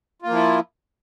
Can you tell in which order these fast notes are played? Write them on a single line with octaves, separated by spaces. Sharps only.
F4 A#3 F3 E4